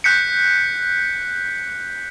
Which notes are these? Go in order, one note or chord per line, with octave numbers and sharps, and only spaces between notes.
F#6 G6 B6 C#7